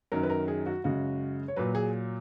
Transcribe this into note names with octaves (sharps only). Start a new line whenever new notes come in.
F#2 D#3 F#3 A#4
B4
A#4
G#4
F#4
F#2 C#3 G#3 F#4
C#5
A#2 F#3 B4
G#4